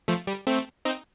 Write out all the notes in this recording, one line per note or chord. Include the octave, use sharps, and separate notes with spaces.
F3 A3
G3
A3 C4
C4 D#4